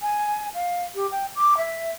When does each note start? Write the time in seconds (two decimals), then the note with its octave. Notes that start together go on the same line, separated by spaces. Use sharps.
0.02 G#5
0.55 F5
0.95 G4
1.11 G5
1.36 D6
1.57 E5